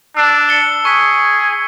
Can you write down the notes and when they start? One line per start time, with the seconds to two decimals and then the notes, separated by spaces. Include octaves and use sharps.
0.17 D4 E6
0.49 C#7 G7
0.85 G#4 C#6 B6